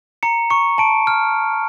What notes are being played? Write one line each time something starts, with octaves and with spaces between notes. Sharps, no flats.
A#5 C#7
C#6 C#7
A5 D7
F6